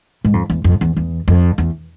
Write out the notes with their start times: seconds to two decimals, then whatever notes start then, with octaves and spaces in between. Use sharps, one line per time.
0.25 G#2
0.33 F2
0.50 E2
0.64 F2
0.81 E2
0.97 E2
1.28 F2
1.58 E2